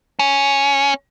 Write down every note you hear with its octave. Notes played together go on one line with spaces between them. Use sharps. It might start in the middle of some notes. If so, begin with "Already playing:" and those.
C#4